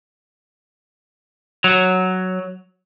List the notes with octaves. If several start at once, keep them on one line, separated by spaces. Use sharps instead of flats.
F#3